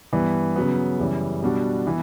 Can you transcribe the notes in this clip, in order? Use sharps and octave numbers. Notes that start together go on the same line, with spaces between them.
G2 E3 B3
C#3 F#3 B3
F#2 C#3 E3 G3
B2 G3 D4 F#4
E3 B3